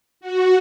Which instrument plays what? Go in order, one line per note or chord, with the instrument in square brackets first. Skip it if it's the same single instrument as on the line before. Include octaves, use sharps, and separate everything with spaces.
[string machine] F#4